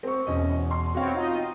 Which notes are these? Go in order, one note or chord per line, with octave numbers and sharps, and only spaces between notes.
C4 C#6
E2 B2 C#4 D#5
C6
B3 C4 F#4 C#5 F5
D#4 F4 D#5